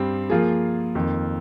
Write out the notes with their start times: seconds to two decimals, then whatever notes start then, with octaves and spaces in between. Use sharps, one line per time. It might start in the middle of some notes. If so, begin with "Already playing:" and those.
Already playing: G2 G3 C4
0.30 F3 A#3 F4 G#4
0.95 F2 D#3 A#3